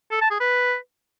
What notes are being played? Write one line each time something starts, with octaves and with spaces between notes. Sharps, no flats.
A4
A5
G#4
B4